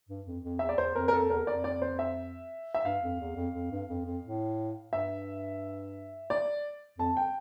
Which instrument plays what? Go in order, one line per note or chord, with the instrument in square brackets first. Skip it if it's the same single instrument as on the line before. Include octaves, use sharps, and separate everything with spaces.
[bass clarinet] G2
F2
F2
[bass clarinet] E2 [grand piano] E5
[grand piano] D5
[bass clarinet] E2 [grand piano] C5
[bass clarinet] F2 [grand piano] A#4
[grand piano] A#4
[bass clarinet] F2 [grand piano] A4
[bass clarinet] E2 [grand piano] A#4
[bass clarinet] F2 [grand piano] D5
[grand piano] D5
C5
E5
E5
[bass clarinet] G2 [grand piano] F5
[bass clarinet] F2
E2
F2
F2
G2
F2
F2
A2
[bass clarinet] G2 [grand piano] E5
[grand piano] D5
[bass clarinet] F2 [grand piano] A5
[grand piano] G5